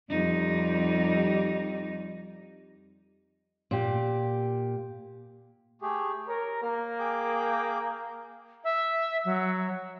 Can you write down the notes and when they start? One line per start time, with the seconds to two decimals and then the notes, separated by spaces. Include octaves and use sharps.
0.10 F2 G3 D#4
3.71 A#2 G4
5.82 A3 G4 G#4
6.28 A#4 C#5
6.62 A#3 F6
6.99 G#4 G5 D6
8.64 E5
9.25 F#3